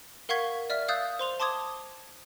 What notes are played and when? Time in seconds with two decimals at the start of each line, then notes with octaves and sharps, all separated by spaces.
0.29 A#4 F5 F#5 C#6 G#6 B6
0.70 D5 E5 F6 B6
0.88 F5 D#6 E6 F#6 G6 A6
1.19 C5 C6 F7
1.40 A5 C6 D6 D#6 G#6